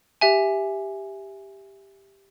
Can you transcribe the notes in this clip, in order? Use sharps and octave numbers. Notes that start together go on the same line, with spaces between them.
G4 E5 G#5